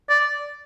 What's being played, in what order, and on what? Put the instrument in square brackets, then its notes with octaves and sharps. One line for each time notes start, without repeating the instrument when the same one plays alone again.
[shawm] D5